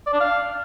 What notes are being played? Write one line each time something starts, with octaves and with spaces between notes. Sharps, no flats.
D5
D4
F5